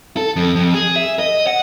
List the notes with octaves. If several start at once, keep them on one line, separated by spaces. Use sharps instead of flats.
A4
F2
F2
G#4
E5
D#5
F#5